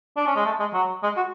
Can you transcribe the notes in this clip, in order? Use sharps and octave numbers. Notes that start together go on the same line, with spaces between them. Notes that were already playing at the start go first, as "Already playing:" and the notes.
D4
C#4
G#3
A3
G#3
F#3
G#3
F#4